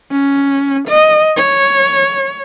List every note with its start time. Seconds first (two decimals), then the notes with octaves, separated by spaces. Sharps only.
0.11 C#4
0.88 D#5
1.37 C#5